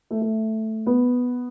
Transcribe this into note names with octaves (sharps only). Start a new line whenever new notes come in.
A3
A3
B3